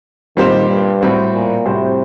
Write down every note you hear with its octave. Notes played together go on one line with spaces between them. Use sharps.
A#2 D#3 G3 C4 G4 C5
G2
A2 G3 C4 F#4 C5
A#2
A2 C3 G3 C4 F#4 C5